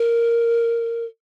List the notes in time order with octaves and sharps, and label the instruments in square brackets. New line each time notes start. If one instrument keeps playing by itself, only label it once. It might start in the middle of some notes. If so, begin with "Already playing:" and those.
Already playing: [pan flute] A#4